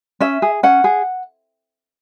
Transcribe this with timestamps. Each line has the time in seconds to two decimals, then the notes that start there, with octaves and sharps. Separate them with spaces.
0.20 C#4 E5
0.42 G#4
0.63 C#4 F#5
0.84 G#4